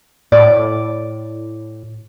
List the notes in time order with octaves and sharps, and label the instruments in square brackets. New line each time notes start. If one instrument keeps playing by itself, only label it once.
[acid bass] A2 [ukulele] D5